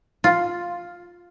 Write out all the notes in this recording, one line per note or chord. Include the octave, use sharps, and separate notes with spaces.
F4